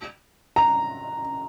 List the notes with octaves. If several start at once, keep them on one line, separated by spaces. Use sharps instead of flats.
A#5